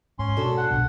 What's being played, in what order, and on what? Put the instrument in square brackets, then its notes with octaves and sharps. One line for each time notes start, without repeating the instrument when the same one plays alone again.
[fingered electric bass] G#2 [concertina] C#4 C6
[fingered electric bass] B2 [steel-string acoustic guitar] D4 F#4 A4
[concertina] F#5
[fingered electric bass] B1 B2 G3